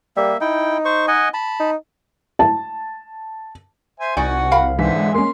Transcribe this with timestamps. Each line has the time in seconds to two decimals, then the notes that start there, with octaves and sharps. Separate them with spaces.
0.17 G3 A#3 E5
0.41 D#4 E4 G5
0.85 C5 C#6
1.08 D#5 F#5 G#5
1.34 A5 B5
1.60 D#4
2.39 A5
4.00 C5 E5 G#5
4.17 C2 D#4 F#4 D5 F#5 G#5 C#6
4.51 A#4 F5 B5
4.78 G#2 D3 E3 C4 E5 B6
4.94 G#3
5.14 A#3 C#4 C6